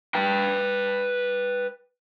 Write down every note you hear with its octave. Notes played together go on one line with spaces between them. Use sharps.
B4 G5